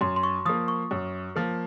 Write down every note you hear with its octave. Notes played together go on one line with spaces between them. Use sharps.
F#2 C6
C6
C#6
F3 A#3 D#6
C#6
F#2
F3 A#3